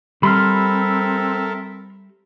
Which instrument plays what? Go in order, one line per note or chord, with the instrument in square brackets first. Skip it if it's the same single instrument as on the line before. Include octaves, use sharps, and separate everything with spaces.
[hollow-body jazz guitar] G3 [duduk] C4 [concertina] A4 A#4 E5 [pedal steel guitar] B5 C6 F6